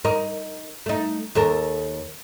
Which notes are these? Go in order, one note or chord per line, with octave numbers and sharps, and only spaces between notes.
D#4 A#4
A3 D#4
D#2 A4 A#4